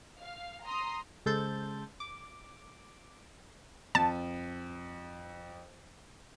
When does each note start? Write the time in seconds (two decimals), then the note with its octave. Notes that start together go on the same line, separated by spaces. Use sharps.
0.18 F5
0.64 A#5 C6 D#6
1.26 C#3 G#3 A4 C5 G6 A6
2.00 D6
3.95 F2 A5